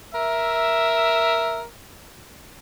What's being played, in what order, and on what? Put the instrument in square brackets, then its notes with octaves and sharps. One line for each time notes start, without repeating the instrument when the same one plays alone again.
[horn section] A#4 E5